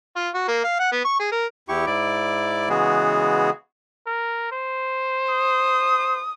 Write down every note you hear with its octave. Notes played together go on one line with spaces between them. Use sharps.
F4
F#4
A#3
F5
F#5
B3
C#6
G#4
A#4
E2 E4 G4 C#6
G#2 E4 D5 D6
C#3 E3 G#3 B3 F#4 G#4
A#4
C5
D#6